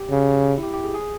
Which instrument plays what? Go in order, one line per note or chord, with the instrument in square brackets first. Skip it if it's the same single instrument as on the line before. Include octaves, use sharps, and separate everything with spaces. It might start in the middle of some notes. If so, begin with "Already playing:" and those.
Already playing: [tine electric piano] G4
[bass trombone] C#3
[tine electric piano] E4
G4
G4
G#4
G#4